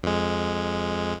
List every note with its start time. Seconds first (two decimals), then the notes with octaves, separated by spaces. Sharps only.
0.03 F2 G#3